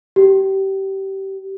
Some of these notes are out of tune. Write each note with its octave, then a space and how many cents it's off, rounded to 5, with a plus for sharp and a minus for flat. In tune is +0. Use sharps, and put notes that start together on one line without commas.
G4 -25